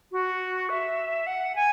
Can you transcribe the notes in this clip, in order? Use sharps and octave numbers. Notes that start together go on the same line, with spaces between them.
F#4
E5
F#5
G#5